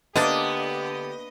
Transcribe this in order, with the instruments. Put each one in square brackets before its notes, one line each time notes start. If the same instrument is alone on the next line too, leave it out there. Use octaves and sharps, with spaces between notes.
[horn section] D3 G4 [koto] A#3 D4 [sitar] B3 [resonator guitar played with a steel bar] D#5